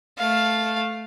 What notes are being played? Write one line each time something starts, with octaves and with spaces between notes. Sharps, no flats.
A3 F5